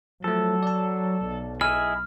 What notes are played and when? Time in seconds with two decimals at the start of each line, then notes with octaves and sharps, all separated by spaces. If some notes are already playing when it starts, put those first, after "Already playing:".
0.24 F3 F#3 A3 A4
0.63 D5 A5
1.24 B1
1.61 E4 G#4 D#5 F6